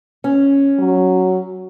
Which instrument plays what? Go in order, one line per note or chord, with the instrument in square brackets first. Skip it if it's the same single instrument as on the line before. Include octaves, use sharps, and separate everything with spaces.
[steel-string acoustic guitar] C#4
[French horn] F#3